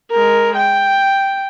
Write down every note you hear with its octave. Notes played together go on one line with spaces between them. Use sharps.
G#3 A#4
G5